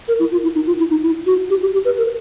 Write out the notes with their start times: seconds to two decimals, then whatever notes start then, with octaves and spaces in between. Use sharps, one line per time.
0.08 A#4
0.19 E4
0.32 F4
0.43 E4
0.55 D#4
0.67 F4
0.79 E4
0.90 D#4
1.03 E4
1.26 F#4
1.50 G4
1.62 G4
1.73 G4
1.85 B4
1.98 A#4